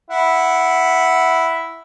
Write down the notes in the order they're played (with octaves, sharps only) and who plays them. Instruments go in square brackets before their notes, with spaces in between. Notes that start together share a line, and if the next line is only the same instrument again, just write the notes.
[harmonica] E4 F#5